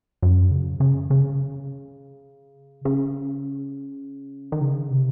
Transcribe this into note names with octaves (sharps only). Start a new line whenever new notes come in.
F#2
C#3
C#3
C#3
C#3
D#3
C#3
C3